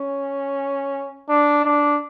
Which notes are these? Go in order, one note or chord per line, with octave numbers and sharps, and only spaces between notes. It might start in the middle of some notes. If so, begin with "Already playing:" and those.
Already playing: C#4
D4
D4